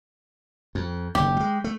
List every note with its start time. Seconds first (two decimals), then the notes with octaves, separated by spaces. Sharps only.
0.75 F2
1.15 F#1 D#2 G4
1.37 G3 G#3
1.64 A3